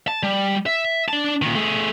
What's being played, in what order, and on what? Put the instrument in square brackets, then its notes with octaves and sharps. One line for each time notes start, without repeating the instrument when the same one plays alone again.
[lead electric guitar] A5
G3
E5
D4 A5
A#2 D#3
A3 G#4